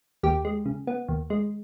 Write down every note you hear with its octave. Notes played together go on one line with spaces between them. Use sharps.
D#2 G4
G#3
C#3
B3
D#2
G#3